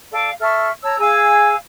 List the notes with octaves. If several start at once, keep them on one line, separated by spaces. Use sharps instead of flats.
A4 D5 F5
A4 E5 C#6 F6
C#5 A5 A#5 E6
G#4 F5 G#5 E6